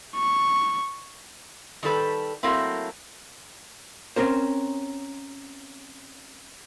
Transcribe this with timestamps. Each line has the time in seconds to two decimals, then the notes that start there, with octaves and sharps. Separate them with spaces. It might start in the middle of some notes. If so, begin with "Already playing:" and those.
0.16 C#6
1.83 D#3 G3 A4 B4
2.43 F#3 A3 A#3 C4 E4
4.16 C4 C#4 A#4 C5